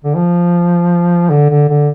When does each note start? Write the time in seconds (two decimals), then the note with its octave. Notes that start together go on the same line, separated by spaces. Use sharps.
0.04 D3
0.15 F3
1.30 D3
1.50 D3
1.68 D3